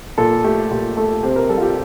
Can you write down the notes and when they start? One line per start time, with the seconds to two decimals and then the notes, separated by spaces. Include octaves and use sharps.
0.18 A#2 A4
0.44 A3 G4
0.71 A#2 G4
0.97 A3 A4
1.23 C3 C5
1.36 A#4
1.49 G3 A4
1.58 F4
1.62 G4